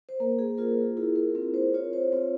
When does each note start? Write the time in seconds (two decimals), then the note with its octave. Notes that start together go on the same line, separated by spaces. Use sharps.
0.09 C5
0.20 A#3 A#4
0.39 G#4
0.58 F4 A#4
0.97 E4 G#4
1.16 A#4
1.35 C4 A#4
1.54 C5
1.74 F4 C#5
1.93 C5
2.12 C4 C#5